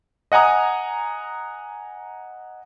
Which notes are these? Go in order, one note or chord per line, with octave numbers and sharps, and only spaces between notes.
D#5 F#5 G#5 A#5 D#6